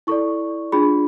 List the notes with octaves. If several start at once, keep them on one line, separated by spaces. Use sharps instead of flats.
E4 A4 D5 C#6
D4 F4 G#4 B5